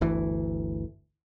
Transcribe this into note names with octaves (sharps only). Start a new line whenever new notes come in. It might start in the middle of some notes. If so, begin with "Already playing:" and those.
G1 D2 E3